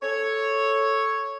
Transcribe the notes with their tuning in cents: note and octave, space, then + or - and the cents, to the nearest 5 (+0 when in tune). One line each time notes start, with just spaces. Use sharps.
A4 +0 C#5 +0